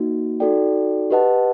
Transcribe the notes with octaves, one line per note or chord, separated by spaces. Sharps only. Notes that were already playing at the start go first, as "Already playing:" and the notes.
Already playing: A#3 D#4 F#4
D#4 F#4 A4 D5 G5
G4 B4 D#5 F#5 A5